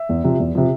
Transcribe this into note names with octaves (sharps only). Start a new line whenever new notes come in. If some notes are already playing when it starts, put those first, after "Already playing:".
Already playing: E5
E2
C3 F3
E2
C3 F3